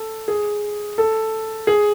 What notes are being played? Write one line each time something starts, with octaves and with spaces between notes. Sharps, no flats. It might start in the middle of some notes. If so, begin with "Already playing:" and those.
Already playing: A4
G#4
A4
G#4